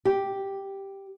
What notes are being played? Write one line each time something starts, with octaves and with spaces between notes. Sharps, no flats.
G4